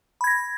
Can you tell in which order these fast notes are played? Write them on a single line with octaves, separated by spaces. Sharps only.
B5 G#6 A#6